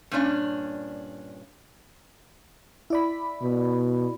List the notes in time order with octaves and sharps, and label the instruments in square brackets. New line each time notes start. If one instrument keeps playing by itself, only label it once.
[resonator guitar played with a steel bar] G2 A#2 C#4 D4
[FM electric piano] E4 D5 B5
[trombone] B2